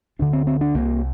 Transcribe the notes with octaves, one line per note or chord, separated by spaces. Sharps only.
D2 D3 D4
C4
C4
D4
C2 C3 A#3